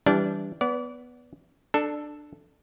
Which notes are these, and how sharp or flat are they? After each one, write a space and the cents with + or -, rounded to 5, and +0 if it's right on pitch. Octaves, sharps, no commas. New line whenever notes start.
E3 +0 G3 +0 D4 -20
B3 +0 D5 -35
D4 +15 A4 +0